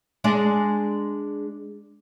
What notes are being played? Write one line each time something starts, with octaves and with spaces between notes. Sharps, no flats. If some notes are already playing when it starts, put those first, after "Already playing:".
G#3 D4 D5